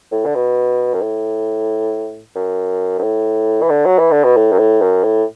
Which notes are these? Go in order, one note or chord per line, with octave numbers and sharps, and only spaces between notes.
A2
D3
B2
F#2
A2
F#2
F#2
A2
E3
D3
F#3
E3
D3
B2
A2
F#2
A2
F#2
A2